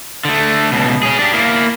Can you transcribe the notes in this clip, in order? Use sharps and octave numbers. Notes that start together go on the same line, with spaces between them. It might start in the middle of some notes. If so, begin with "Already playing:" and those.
D3 A3
C#2 B2
C#4 G#4
D4 G4
A#3 E4